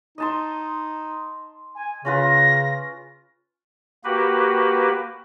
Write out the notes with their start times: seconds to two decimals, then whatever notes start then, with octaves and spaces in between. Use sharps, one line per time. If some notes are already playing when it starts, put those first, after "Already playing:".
0.18 D#4 D#5 A5 C6
1.75 G#5
2.05 C#3 C#4 F4 B4 A#6
4.04 A#3 F#4 G4 B4